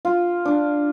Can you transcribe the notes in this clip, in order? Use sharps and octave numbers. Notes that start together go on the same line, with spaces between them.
F4
D4